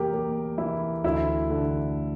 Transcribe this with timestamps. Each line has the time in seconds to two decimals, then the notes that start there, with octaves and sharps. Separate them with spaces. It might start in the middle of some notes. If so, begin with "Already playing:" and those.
Already playing: E2 A#3 G4 A#4
0.13 A#3
0.58 E3 E4
1.04 D2 E4
1.50 D3